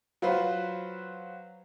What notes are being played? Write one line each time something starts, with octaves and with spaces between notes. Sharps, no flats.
F#3 F4 B4 C5